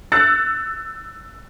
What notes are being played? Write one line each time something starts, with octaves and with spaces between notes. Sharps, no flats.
E6 F#6 A6 C#7